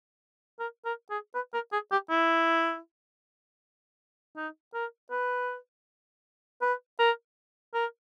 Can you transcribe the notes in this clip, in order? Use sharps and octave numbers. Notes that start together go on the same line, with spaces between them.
A#4
A#4
G#4
B4
A#4
G#4
G4
E4
D#4
A#4
B4
B4
A#4
A#4